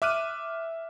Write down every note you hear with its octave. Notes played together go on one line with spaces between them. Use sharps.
E5 D6 F6 F#6 D#7